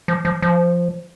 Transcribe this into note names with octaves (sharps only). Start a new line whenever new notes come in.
F3
F3
F3